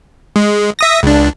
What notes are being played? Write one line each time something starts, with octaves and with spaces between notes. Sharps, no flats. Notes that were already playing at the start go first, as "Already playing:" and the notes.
G#3
E5 D#6 A#6
C#2 D4